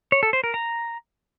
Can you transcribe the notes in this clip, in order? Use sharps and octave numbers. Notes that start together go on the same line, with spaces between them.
C#5
A4
C5
A#4
A#5